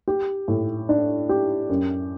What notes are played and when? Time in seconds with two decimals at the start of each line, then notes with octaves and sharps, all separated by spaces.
0.08 G4
0.48 A2
0.89 D4
1.29 G4
1.69 F#2